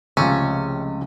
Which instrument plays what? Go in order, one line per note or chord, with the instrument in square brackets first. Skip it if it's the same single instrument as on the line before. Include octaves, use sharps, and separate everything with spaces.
[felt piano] C#2 F3 [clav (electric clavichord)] C3 A3 [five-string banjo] C#4